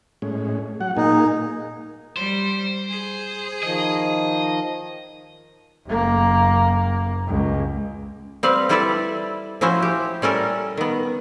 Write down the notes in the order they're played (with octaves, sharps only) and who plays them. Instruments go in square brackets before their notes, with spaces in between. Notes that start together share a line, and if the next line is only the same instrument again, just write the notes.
[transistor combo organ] A2 G#3 C#4
F#3 F#5
[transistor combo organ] A#2 A#3 G#4 [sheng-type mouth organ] D#4
[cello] G3 [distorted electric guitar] C5
[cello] G#4
[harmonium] D#3 F3 [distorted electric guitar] D#5
[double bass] F#1 A#3
C#2
[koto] G3 C4 B4 F5
G3 E4 A4 B4 D5 E5
F3 C#4 E4 F#4 C5
G4
G3 C#4 A4 A#4
D#3 B3